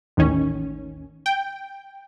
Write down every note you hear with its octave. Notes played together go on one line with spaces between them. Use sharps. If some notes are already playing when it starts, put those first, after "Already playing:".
A1 D#2 D#3 C#4
G5